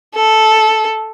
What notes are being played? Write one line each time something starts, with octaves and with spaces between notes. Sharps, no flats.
A4